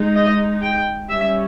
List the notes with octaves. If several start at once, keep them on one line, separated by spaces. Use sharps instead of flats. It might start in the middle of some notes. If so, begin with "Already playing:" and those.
Already playing: G#3 D#4
D#5
G5
G3 C#4 E5